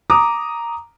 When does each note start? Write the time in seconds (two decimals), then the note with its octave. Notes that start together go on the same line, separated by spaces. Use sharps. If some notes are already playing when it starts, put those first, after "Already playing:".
0.10 A#5 D6 D#6